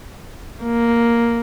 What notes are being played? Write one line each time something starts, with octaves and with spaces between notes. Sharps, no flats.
A#3